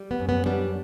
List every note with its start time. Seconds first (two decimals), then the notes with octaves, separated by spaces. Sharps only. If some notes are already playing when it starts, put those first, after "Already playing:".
Already playing: G3
0.11 B3
0.20 F#2
0.29 B3
0.46 G3 D4